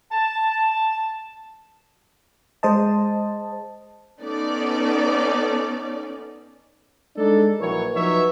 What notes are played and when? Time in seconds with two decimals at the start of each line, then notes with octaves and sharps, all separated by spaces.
0.12 A5
2.63 G#3 C5 D#5 A5
4.20 B3 C#4 D#4 A4 D5
7.17 G#3 D4 D#4 A4
7.60 A#1 E3 F#3 A#4 C#5
7.94 F3 F#3 D#4 B4 C#5 E5